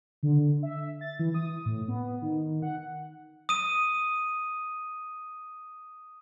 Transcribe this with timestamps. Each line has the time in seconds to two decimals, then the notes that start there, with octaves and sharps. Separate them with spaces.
0.23 D3
0.63 E5
1.01 A6
1.19 E3
1.34 D#6
1.66 A2
1.88 B3
2.22 D#3
2.62 F#5
3.49 D#6 D#7